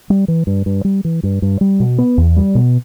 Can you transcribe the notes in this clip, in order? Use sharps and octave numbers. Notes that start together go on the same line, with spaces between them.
G3
E3
G2
G2
G3
E3
G2
G2
G3
B2
B3
E2
G3
B2